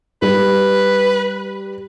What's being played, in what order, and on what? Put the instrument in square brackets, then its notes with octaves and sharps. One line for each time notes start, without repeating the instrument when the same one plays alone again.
[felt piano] G3 [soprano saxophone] B4